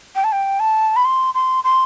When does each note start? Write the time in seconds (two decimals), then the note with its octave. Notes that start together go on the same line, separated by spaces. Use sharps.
0.15 G5
0.24 A5
0.32 G5
0.60 A5
0.96 B5
1.05 C6
1.34 C6
1.64 C6